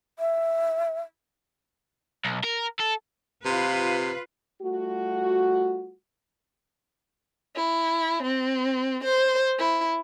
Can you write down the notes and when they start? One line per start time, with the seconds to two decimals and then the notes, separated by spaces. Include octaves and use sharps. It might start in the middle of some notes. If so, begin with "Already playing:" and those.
0.19 E5
2.25 B1
2.44 A#4
2.80 A4
3.45 C3 F4 B4
4.62 G3 A3 F4 F#4
7.56 E4
8.23 C4
9.04 C5
9.59 E4